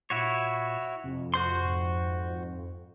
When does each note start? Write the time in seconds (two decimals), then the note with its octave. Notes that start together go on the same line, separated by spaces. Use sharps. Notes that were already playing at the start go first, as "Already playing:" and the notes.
0.10 A#2 E4 F#4 C#5
1.04 F2 C3
1.34 F#4 C5 C6
1.64 G#2